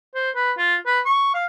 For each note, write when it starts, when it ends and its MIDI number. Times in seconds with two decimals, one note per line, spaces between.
0.15 0.30 72
0.35 0.52 71
0.58 0.75 65
0.86 1.00 71
1.05 1.33 85
1.34 1.46 77